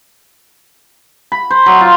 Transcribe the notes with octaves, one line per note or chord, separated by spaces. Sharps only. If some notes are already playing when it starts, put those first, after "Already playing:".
B5
C5
F#3
F4